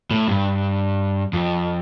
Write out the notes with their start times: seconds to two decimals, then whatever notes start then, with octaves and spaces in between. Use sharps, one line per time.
0.11 A2
0.28 G2
1.33 F2